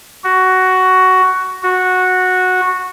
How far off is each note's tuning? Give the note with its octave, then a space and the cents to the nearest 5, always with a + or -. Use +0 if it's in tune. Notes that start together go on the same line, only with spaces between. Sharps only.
F#4 +10
F#4 -10